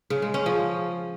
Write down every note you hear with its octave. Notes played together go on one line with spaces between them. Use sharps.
C#3
G#3
C#4
F3